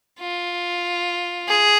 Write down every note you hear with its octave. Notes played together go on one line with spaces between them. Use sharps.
F4
G#4